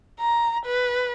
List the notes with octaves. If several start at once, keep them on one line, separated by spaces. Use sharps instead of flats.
A#5
B4